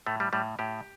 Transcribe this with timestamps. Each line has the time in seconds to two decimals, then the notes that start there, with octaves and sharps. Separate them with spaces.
0.06 A2 A3
0.20 G3
0.33 A2 G3
0.59 A2 G4